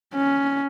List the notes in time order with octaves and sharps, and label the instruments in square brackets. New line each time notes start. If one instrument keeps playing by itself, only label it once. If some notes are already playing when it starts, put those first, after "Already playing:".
[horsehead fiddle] C#4